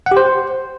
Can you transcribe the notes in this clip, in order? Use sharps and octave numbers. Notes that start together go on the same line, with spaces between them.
F#5
G4
C5